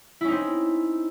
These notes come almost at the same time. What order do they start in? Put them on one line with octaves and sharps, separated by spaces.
E4 C#4 D#4 C4